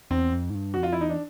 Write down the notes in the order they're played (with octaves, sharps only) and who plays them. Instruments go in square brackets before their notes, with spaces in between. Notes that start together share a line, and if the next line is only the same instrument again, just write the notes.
[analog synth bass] E2 [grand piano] C4
[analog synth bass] F2
G#2
G2
[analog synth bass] F2 [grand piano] F#4
[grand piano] F4
E4
[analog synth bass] E2 [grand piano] D#4
[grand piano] D4